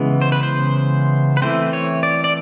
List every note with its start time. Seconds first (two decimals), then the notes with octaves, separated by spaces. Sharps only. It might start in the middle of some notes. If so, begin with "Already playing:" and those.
Already playing: C#3 E3 G#3 B3
0.22 C5
0.32 B4
0.43 C5
1.37 B4
1.42 E3 A3 C4 C5
1.73 C#5
2.03 D5
2.24 D5